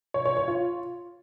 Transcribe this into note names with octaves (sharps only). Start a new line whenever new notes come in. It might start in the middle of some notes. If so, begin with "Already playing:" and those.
C#5
C#5
C#5
F4